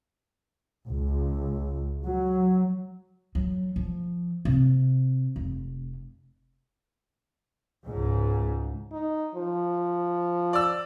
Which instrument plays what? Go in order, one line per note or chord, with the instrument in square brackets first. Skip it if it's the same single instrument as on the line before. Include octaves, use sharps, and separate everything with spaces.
[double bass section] C#2
F#3
[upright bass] F#3
F3
C3
F1
[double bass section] C#2 G#2
[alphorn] D#4
F3
[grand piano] D5 E6